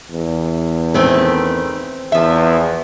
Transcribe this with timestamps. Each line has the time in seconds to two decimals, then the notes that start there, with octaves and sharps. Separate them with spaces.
0.11 E2
0.94 D#3 A3 C4 C#4 B4
2.12 E2 F3 E5